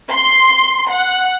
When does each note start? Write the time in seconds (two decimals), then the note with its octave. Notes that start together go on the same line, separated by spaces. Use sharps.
0.11 C6
0.90 F#5